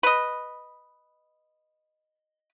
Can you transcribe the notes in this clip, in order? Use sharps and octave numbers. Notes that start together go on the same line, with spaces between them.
B4 D#5